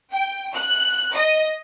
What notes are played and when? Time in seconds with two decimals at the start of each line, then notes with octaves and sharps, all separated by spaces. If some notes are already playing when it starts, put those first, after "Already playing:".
0.12 G5
0.55 F#6
1.15 D#5